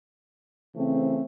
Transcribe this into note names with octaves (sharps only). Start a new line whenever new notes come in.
C#3 E3 A3 C4